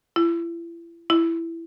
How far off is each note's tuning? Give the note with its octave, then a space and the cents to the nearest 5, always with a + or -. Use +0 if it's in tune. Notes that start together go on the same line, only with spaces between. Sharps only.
E4 +35
E4 +10